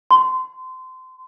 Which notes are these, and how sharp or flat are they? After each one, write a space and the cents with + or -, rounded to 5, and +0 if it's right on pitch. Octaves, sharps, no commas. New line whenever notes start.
C6 -25